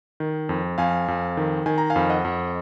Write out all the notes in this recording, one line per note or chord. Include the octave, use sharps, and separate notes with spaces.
D#3
F2
F2 F5 G#5
F2
D#3
D#3 G#5
A#5
F5 G#5
F2
D#5 F#5
F2